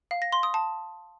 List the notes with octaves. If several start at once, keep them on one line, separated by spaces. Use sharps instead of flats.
F5
A#6
C6
D#6
A5